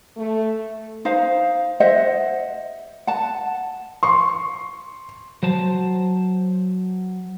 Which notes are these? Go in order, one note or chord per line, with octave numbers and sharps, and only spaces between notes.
A3
D#4 C5 F5
C5 D#5 E5 F#5
F#5 A5
C6 C#6
F#3 C5 A5